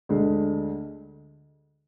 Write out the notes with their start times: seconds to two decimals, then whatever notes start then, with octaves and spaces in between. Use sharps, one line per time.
0.09 D2 D3 G#3